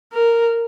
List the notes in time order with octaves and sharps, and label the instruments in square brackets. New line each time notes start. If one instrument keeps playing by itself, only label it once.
[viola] A#4